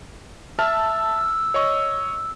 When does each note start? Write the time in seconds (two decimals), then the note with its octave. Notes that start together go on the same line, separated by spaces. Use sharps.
0.59 E5 A5 E6 F6
1.54 C#5 D#5 C#6